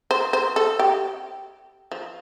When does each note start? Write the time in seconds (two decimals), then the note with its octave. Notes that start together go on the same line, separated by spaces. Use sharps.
0.11 C5
0.33 C5
0.56 A4
0.79 G4
1.92 F3